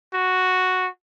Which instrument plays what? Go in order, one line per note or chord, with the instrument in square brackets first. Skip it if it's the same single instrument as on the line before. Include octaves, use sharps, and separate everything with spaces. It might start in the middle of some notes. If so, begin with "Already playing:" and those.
[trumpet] F#4